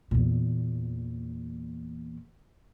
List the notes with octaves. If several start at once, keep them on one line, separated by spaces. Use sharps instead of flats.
E2 A#2